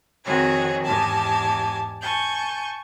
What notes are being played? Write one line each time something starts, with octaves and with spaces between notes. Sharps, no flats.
F2 D#3 C4 F#4 G#4 C#5
E2 G#2 G4 G#5 A5
G#5 A5 C#6 G6